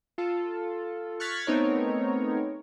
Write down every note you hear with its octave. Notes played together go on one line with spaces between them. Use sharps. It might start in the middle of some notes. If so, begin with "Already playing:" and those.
F4 A4
C#6 F6 F#6 G#6 A6 B6
A3 B3 C4 D#4 A#4 C#5